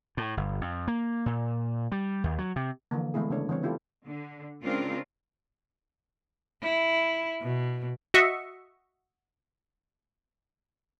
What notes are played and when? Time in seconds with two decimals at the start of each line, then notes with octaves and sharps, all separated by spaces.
0.17 A2
0.37 G1
0.61 F2
0.88 A#3
1.26 A#2
1.92 G3
2.24 D#2
2.38 F#3
2.56 C3
2.91 D3 E3 F3 A#3
3.14 E3 G#3 A3 B3 E4 G#4
3.30 C#3 A3 D4 C#5
3.49 E3 G3 C4 C#5
3.62 B3 C4 E4 F4 G4 A4
4.08 D3
4.64 C#3 G#3 C4 D4 F4 A#4
6.62 E4
7.42 B2
8.14 F#4 D#5 E5 C#6